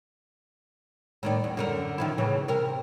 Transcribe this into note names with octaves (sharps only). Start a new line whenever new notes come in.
A2 D#3 D5
E2
F#2 D3 A#4
D#3 F3 E4
A2 C#3 E3
C3 A#4